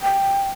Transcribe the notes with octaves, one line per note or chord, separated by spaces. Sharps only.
G5